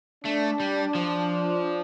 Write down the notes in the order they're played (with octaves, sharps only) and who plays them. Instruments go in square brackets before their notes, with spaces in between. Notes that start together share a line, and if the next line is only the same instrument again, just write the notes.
[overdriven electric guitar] A3 [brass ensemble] D4
[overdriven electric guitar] G3
F3